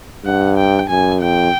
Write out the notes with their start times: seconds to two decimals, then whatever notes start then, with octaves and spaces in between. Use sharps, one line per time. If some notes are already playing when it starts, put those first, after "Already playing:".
0.25 G2 F#5
0.57 G5
0.89 F#2 G#5
1.21 F2 G5